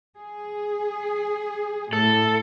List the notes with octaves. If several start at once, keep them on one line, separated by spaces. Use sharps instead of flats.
G#4
A2 A4